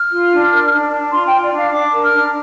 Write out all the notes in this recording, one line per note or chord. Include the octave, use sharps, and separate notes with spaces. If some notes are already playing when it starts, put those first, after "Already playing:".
Already playing: F6
F4
D4
A#4
D4
D4
F4 C6
G5
F4
D5
D4
F5
D4 D6
A#4
F6
D4